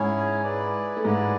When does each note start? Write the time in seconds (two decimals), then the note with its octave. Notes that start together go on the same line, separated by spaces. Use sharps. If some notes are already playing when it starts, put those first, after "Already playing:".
Already playing: G#2 G#3 C#4 E4 G#4 C#5
0.43 E4 G#4 B4 D5
0.97 A3
1.05 G#2 G#3 E4 G#4 B4 D5